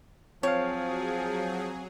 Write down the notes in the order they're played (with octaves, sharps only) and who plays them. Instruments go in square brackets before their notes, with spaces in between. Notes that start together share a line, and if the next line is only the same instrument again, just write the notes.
[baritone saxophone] F3 [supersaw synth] F#3 G#4 [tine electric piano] C4 F5 [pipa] C#5